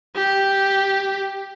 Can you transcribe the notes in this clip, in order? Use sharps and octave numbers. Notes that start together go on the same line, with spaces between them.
G4